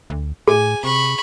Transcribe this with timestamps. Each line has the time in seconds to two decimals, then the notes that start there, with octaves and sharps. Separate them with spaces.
0.10 D2
0.48 A2 G#4 G#5
0.84 C3 B5 C#6